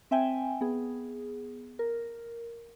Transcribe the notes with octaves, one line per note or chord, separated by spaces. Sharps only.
C4 E5 G5 G#5
B3 G#4
A#4